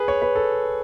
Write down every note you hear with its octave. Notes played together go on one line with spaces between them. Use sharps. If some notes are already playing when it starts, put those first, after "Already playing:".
Already playing: G#4 B4
C#5
B4
A4